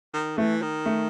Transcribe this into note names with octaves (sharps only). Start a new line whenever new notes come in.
D#3
E3 A3
D#3
A3